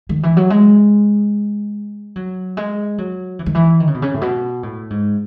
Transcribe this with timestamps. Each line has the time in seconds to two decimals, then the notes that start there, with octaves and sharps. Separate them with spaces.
0.09 D#3
0.23 E3
0.37 F#3
0.50 G#3
2.16 F#3
2.57 G#3
2.98 F#3
3.39 E3
3.46 D#3
3.55 E3
3.80 D#3
3.87 C#3
3.94 B2
4.02 C#3
4.14 A2
4.21 B2
4.63 A2
4.90 G#2